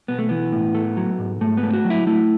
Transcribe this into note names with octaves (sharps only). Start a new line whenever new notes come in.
B1 B3
A3
E3 B3
A2
A3
F#3
G#2
G#2 A3
B3
A3
F#4
F#3
E4
A3 E4